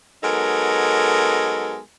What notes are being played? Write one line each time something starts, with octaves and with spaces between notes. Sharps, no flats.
F#3 G#3 B3 D#4 A4 A#4